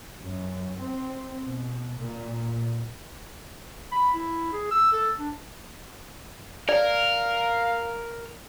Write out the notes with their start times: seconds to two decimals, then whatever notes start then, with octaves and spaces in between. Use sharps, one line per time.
0.20 F#2
0.79 C4
1.45 B2
2.00 A#2
3.92 B5
4.13 E4
4.53 G#4
4.71 E6
4.93 A4
5.19 D4
6.69 A#4 D5 F5